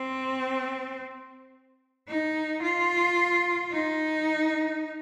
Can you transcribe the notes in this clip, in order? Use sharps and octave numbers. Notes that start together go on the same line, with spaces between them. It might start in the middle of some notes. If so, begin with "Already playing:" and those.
Already playing: C4
D#4
F4
D#4